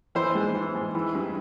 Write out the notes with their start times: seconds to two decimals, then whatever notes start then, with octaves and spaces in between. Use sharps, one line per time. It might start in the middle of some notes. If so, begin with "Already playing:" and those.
0.15 E3 C5
0.35 G#2
0.55 E3
0.75 G#2
0.95 E3
1.15 G2